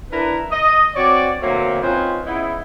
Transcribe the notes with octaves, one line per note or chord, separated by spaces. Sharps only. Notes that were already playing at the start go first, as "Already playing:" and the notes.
D4 E4 A#4 B4
D#5
C4 F#4 C#5 D5
D3 F#3 A3 A#3 C4
C4 C#4 D#4 F4 B4 C5
C#3 B3 D#4 E4